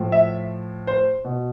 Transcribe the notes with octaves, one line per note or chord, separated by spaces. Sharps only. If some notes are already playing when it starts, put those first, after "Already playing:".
Already playing: A2 F3
E5
C5
B2